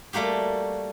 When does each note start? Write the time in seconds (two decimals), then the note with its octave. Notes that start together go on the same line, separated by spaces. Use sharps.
0.13 G3 A3 A#3 F#4 G4